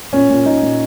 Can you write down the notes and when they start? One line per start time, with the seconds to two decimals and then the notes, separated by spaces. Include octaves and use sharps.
0.13 A#2 C#4
0.29 A#2
0.46 A#2 D#4
0.63 A#2